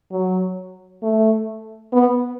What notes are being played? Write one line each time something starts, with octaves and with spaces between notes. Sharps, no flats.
F#3
A3
B3